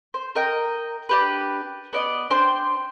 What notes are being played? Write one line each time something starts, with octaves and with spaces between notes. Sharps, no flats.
C5
A#4 D#5 G5
D4 G4 B4
B3 D5 D#5
D4 C5 G5 C6